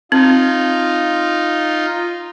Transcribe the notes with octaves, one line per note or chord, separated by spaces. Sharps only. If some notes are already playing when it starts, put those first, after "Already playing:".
C4 D#4 F4